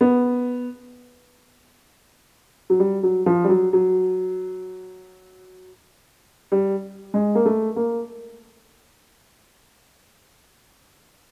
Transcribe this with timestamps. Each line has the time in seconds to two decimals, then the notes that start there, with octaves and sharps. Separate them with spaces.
0.01 B3
2.70 F#3
2.80 G3
3.03 F#3
3.26 F3
3.44 G3
3.49 F#3
3.73 F#3
6.52 G3
7.14 G#3
7.35 A#3
7.46 A3
7.76 A#3